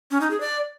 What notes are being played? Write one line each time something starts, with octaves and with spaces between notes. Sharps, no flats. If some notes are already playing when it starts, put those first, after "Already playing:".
C#4
D#4
G#4
D5